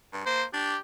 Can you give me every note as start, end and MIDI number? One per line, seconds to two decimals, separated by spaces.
0.13 0.23 43
0.26 0.44 58
0.26 0.44 72
0.54 0.75 62
0.54 0.78 67